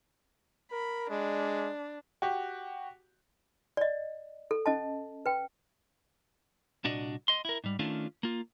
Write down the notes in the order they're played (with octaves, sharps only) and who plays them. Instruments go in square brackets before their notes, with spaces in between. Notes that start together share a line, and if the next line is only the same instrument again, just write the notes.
[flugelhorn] A#4 [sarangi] B5
[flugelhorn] G#3 [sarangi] D4
[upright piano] F#4 G4
[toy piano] D5 D#5
A4
C#4 D#5 A5
B4 G5
[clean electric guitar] C2 A#2 D4 F#4 D5 D#5
D#5 C6
E4 A#4
G#2 G3
D#3 A3 C#4 D4 F4
A#3 F4